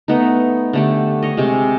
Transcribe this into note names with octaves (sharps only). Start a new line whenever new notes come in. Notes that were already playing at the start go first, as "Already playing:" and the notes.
A3 B3 D#4
D3 A3 G4
C#5 D#5
C3 G#3